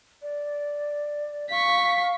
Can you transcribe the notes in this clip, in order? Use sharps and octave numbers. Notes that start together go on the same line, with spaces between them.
D5
F5 C#6 B6